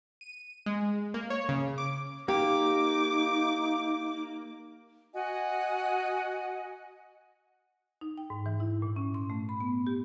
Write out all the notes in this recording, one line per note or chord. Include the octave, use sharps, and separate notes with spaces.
D#7
G#3
A#3
C#5
C#3
D6
A#3 D#4 G4 D6
F#4 D#5 F#5 G#5
D#4
G5
G#2
E3
E4
A#2
C#4
C6
A3
B5
B3
G4